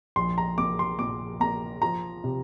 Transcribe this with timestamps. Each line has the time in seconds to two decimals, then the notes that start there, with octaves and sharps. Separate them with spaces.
0.16 A#1 C6
0.38 A#5
0.58 A#3 D6
0.79 C6
0.99 A#2 D6
1.40 A#3 A#5
1.82 F3 A#5
2.24 C3